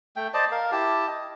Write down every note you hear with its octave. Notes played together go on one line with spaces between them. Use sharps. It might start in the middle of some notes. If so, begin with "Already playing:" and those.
A3 G5
C5 D5 D#5 A5
A#4 F5
E4 G4 A5
D#5